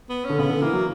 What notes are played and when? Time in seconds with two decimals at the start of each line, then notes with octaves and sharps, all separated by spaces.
0.09 B3
0.25 D3 C#4
0.39 C#3 B3
0.50 D3
0.62 E3 A#3
0.73 F#3